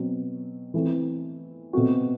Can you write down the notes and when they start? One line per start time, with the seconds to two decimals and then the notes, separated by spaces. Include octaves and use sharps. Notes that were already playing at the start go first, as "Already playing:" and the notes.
Already playing: B2 F#3 C4
0.74 E3 A3 C4
1.73 B2 A3 C4 F#4